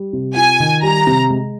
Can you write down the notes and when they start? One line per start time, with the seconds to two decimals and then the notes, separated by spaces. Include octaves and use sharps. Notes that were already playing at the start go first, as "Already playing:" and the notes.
Already playing: G3
0.13 C3
0.35 F4 G#5
0.60 D#3
0.83 G3 A#5
1.07 C3
1.30 G#3